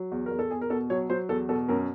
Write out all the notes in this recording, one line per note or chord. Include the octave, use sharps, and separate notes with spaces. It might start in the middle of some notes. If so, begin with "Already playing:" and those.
Already playing: F#3
E2
E2 A#4
A4
E2 G#4
A#4
B2 A4
F#3 C#5
F#3 C5
E2 A4
B2 A4
F#2 A#4